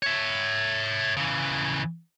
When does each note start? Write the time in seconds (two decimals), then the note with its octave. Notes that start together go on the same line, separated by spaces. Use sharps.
0.02 C#5 E5
1.17 C#3 E3